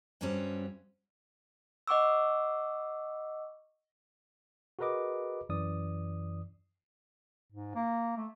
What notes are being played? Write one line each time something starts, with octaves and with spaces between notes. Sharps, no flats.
G2 D3 F#3 G3 C4 C#4
D#5 F#5 C#6 D6 E6
F#4 G#4 A#4 B4 D#5 D6
F#2 E3 D5 D#6
G#2
A#3
A3